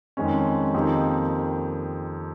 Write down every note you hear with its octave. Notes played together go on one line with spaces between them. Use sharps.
F2 D#3 G#3 C#4
F2 D#3 A#3 D#4 G4